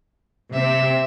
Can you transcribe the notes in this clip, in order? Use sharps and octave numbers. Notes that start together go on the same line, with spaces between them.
C3 C4 E5